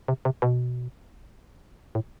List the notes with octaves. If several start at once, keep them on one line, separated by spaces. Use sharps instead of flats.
C3
C3
B2
A2